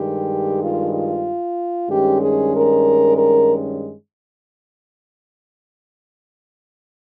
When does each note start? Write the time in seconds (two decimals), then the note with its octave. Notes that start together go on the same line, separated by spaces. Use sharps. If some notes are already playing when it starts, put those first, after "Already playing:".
Already playing: G2 D#3 G#3 G4
0.60 F4
0.92 F4
1.88 G2 D#3 G#3 C#4 G4
2.21 G#4
2.53 A#4
3.17 A#4